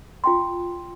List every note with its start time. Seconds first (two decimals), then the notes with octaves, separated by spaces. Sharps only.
0.24 F4 G5 C6